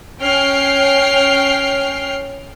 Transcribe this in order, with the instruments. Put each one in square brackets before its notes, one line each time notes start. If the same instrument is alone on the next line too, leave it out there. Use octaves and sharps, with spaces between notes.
[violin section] C#4 G5 F6 C7